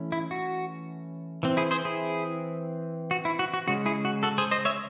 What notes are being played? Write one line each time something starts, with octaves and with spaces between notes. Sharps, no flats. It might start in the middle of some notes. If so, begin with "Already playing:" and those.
Already playing: E3 A3 C#4
E4
F#4
E3 C4
E4 G#4
G#4 C5
E4 G#4
F#4
E4
F#4
F#4
C#3 G#3 C#4 F#4
E4 G#4
F#4
F#4 A4
G#4 C5
C5 D#5
C#5 E5